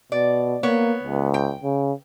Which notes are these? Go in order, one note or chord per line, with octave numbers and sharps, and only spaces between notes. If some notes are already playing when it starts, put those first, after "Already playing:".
B2 D5
A#3 B3 C#5
C#2
G5
C#3